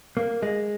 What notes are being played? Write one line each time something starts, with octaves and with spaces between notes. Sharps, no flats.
A#3
G#3